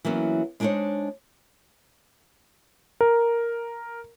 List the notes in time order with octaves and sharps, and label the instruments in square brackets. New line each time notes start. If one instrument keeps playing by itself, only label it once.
[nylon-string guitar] E3 F#3 A#3 B3 C#4
G#3 D4 D#4 G4 C5 C#5
[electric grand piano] A#4